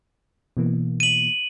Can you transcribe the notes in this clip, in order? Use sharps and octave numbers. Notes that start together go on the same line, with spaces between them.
B2 E3 A#3
D#7 F#7